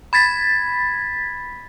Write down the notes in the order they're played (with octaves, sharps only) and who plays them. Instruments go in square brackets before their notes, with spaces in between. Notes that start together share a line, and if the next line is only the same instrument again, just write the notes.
[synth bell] B5 G#6 A6 B6